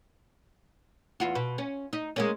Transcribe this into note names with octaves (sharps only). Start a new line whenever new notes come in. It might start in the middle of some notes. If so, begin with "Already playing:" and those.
E2 F4 F#4
B2
C#4
D#4
G#3 A#3 C#4